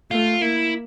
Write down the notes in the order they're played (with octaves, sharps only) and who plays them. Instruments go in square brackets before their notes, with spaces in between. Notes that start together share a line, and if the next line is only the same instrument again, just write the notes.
[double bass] A3 [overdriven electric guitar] F4
[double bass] A#3 [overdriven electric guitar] E4